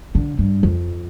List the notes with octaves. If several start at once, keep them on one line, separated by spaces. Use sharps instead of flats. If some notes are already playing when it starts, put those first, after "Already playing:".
D3
G2
F2